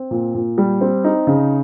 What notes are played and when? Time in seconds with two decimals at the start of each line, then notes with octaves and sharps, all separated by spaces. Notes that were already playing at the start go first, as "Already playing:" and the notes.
Already playing: C4
0.11 A#2
0.35 A#2
0.58 G3
0.81 C4
1.04 D#4
1.27 C#3